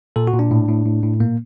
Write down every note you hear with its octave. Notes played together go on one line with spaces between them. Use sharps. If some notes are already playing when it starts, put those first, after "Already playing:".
A#2 A4
F#4
A#2
D4
A2
A2
A2
A2
A#2 A#3